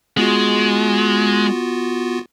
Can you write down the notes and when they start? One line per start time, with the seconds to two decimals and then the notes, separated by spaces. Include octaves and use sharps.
0.17 G#3 B3 F4 F#4